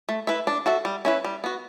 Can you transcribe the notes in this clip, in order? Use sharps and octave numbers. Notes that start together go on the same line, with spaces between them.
A3
E4 B4 E5
D4
F#4 A4 E5
G3
C#4 E4 B4
G3
B3 F#4